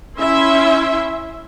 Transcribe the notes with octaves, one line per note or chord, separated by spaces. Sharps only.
C#4 E4 E5 C6